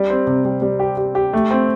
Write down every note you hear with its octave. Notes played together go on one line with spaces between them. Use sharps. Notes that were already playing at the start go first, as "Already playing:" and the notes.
Already playing: G3
C4
C3
G3
G3
G4
G4
G4
A3
C4